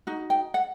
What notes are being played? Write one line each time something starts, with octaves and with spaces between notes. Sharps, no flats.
D#4 F#4
G5
F#5